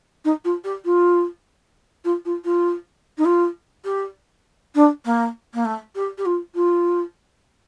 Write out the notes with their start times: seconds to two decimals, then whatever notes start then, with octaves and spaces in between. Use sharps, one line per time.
0.25 D#4
0.44 F4
0.64 G4
0.85 F4
2.04 F4
2.25 F4
2.44 F4
3.18 D#4
3.25 F4
3.85 G4
4.75 D4
5.05 A#3
5.54 A#3
5.65 A3
5.95 G4
6.18 G4
6.26 F4
6.55 F4